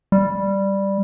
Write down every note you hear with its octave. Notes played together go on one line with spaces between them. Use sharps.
G3